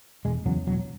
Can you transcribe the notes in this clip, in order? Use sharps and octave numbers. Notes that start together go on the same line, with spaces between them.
E1 G#3
E2 C#3 F#3
E1 F#3